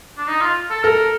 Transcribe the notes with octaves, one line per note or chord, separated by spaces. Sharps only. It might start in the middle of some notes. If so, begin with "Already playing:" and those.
D4
D#4
F4
A4
A4 A#4